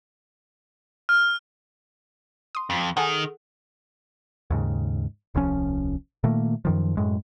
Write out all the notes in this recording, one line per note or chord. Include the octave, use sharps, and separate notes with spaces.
F6
C6 D#6
F2
D#3 G#4 A4 F#5
D#2 G#2 C#3
D#1 C2 F3 C#4
A#2 D#3 A3 A#3
F#2 D#3 F3
F#2 A2 G#3